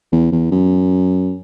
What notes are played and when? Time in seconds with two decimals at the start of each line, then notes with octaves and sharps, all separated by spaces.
0.12 E2
0.32 E2
0.52 F#2